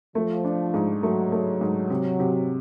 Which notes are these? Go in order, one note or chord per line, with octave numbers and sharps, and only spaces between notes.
F3 A3
D4
G#2
F#3 A3
A3
G#2
C3
C3